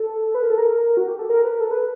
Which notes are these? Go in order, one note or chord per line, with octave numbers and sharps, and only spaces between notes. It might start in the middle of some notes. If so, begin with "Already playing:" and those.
Already playing: A4
B4
A#4
A4
A#4
F#4
G4
A4
A#4
B4
A#4
A4
B4